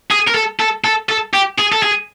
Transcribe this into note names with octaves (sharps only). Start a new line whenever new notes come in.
G#4
A#4
A4
A4
A4
A4
G4
G#4
A4
G#4